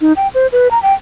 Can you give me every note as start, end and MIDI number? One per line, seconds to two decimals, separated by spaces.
0.01 0.13 63
0.16 0.28 79
0.35 0.47 72
0.52 0.70 71
0.71 0.81 82
0.83 0.93 79